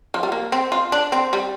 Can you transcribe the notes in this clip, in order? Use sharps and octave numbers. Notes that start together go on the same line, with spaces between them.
F3
G3
A#3
C4
F4
D4
C4
G3